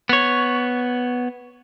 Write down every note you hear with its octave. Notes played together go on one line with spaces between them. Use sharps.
B3 C#5